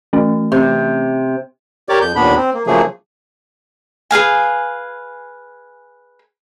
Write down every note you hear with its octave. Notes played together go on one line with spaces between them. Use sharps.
E3 A3 C#4
C3
G4 A#4 C#5 D5 D6
F2 G6
D#2 A#2 B3 D4 B5
C4
A#3
C#3 F3 F#3 A3 A#3 G#4
G#4 B4 F5 G#5